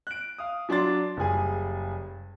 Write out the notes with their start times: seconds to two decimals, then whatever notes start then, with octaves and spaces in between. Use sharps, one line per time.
0.07 F#6 D7
0.38 F5 D#6
0.69 F#3 D4 A5 C6 A6
1.17 F#1 G3 G#4 G#5